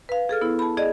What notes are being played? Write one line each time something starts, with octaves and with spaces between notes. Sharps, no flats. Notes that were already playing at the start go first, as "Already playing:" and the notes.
B4 F5
G#4 A4 F6
B3 E4
A5 B5
G#4 D5 D#5